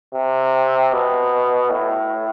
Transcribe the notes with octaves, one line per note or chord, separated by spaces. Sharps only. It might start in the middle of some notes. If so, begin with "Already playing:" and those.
C3
B2
A2